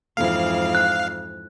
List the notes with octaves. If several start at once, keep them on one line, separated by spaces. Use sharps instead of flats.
F2 G#2 E3 F5
F#6